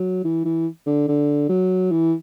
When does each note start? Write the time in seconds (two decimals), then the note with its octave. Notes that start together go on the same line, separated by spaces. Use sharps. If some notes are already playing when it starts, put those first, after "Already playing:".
Already playing: F#3
0.24 E3
0.45 E3
0.86 D3
1.08 D3
1.49 F#3
1.91 E3